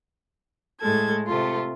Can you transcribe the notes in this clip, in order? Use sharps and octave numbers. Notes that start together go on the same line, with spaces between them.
A2 G#3 A4 G#6
C3 A3 F4